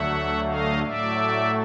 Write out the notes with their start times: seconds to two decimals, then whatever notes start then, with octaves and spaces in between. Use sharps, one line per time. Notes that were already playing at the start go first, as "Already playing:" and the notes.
Already playing: D2 D3 F#3 A3 E5 F#5
0.46 D#5 F5
0.83 A2 F#3 A3 D5 E5